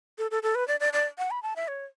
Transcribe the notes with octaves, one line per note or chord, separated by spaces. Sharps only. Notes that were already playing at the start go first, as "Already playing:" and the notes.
A4
A4
A4
B4
D5
D5
D5
F#5
B5
A5
E5
C#5